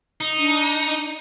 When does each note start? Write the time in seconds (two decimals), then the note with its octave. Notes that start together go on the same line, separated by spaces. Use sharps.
0.21 D#4
0.38 D4